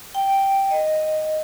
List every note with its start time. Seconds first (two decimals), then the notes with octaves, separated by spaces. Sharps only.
0.15 G5
0.71 D#5